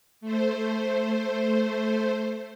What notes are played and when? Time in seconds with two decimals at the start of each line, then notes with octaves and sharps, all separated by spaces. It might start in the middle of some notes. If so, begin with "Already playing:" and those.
0.21 A3 C5